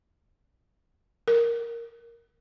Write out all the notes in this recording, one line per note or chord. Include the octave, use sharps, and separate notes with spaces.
A#4